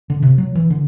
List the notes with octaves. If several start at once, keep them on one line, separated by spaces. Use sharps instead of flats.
D3
C3
F#3
E3
D3